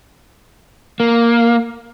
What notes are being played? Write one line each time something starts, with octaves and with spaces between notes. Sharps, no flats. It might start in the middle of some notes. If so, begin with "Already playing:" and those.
A#3